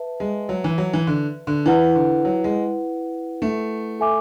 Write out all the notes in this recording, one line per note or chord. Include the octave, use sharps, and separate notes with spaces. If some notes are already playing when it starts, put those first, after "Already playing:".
Already playing: B4 E5 A5
G#3
F#3
E3
F#3
E3
D3
D3
E3 E4 B4 F#5
D3
F#3
G#3
A3
A4 E5 G#5 D6